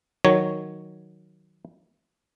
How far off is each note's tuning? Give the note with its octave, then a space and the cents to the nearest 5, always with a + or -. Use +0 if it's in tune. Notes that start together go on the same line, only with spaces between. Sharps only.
D#3 +0 F#3 +0 C#5 +0